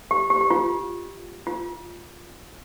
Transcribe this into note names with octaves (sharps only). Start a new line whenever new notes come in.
G4
G4
G4
F4
F4